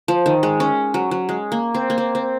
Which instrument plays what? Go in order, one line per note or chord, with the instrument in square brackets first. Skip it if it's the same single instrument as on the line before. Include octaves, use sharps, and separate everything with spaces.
[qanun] F3
D#3
G#3
C#4
F#3
F#3
G#3
A#3
C4
A#3
C4
C4